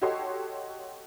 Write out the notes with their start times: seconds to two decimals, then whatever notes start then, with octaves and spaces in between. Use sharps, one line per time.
0.01 F#4 G4 A4 C#5 D#5 C6